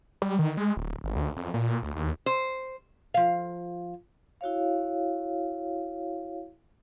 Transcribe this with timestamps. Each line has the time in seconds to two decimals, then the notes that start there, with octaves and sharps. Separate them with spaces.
0.22 G3
0.39 D#3
0.57 G#3
0.77 D1
1.04 G#1
1.16 D2
1.37 F2
1.54 A#2
1.83 D2
1.96 D#2
2.26 C5
3.14 F3 F5
4.41 E4 F#4 C#5 F5